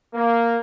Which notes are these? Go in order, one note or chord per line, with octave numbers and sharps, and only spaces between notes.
A#3